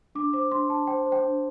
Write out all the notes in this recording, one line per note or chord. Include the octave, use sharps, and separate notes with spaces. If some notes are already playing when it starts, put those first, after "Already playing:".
D4 D6
C5 D6
D4 C6
D4 A5
C5 G5
C5
G5
D4